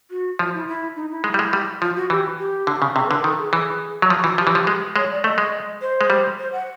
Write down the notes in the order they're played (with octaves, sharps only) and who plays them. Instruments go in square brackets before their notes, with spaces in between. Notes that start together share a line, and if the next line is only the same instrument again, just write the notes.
[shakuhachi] F#4
[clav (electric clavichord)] F3 [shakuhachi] F4
[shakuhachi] E4
E4
D#4
E4
[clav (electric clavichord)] G#3
G3
G#3
G3
[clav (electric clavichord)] F3 [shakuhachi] F4
[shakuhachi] F#4
[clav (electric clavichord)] E3 [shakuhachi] G4
[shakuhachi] G4
[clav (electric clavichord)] D3
C#3
[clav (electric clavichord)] C3 [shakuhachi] G#4
[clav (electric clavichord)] D3 [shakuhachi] B4
[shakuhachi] A#4
[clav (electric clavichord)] D#3 [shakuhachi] A4
[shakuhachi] G#4
[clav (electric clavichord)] E3 [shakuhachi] G#4
[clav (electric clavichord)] F#3
F3
[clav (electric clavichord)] E3 [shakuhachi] F#4
[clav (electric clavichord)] F3 [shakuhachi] G4
[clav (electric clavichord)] E3
F3
G#3
[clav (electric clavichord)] G#3 [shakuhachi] C#5
[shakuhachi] D5
[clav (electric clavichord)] A3 [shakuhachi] D#5
[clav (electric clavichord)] G#3
[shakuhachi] C5
[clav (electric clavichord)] G#3
G3
[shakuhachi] C5
F#5